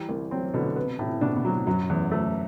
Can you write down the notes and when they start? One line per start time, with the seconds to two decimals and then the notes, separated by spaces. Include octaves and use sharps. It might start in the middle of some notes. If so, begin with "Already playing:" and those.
Already playing: E3 G3
0.09 C2
0.31 F#3 C4
0.54 B2 D3
0.76 C3 B3
0.99 A2 C3
1.21 B2 D4
1.36 B2
1.45 F#3
1.52 A2
1.67 F#2 F#3
1.90 E2
2.11 A3